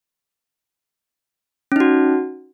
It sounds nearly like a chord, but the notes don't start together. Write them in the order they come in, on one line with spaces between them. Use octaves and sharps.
C#4 D#4 F#4